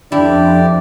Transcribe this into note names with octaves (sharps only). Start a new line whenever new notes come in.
F2 F3 D4 E4 G4 D5